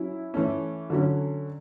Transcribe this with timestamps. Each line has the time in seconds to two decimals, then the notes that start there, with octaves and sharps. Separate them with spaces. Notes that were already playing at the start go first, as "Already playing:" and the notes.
Already playing: F#3 C#4 E4
0.34 E3 A3 C#4
0.90 D3 F#3 C#4